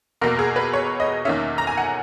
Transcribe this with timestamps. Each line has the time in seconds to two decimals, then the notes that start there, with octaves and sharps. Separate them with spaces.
0.21 E2 B2 A#3 A#4
0.39 G#4
0.56 B4
0.73 C#5
1.00 D#5
1.25 E2 D#3 A#3 C#4 E5
1.58 A#5
1.67 G#5
1.77 F#5